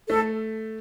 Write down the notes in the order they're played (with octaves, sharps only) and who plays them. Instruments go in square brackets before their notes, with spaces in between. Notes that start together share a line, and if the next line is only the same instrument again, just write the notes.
[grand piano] A3 [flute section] A4